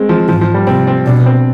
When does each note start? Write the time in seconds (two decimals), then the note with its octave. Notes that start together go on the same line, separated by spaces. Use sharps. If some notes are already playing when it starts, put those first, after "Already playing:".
Already playing: G#3 C4
0.09 F3
0.29 G#2 F3
0.41 F3
0.54 G3
0.67 C3 C4
0.87 C4
1.06 B2 D4
1.26 C4